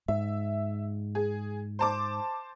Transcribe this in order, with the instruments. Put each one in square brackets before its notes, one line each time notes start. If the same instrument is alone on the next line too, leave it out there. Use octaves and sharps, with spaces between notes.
[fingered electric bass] G#2 [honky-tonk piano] E5
[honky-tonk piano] G#4
C5 A5 D6